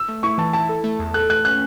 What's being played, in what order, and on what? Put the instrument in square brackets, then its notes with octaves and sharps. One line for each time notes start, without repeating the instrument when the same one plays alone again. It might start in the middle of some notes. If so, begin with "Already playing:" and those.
Already playing: [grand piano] E6
[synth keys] A3
[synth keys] E4 [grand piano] C#6
[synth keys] E3 [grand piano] A5
[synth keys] E4 [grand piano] A5
[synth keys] A4
A3
E2
[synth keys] A4 [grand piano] F#6
[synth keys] A3 [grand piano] F#6
[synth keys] C#4 [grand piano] F#6